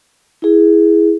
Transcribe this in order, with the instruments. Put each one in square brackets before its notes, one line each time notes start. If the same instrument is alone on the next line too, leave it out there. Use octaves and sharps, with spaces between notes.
[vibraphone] E4 G#4